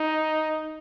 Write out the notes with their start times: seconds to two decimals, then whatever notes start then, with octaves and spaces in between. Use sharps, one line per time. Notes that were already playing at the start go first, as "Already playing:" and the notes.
Already playing: D#4